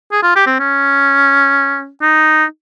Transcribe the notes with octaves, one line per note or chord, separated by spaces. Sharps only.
G#4
F4
G4
C4
C#4
D#4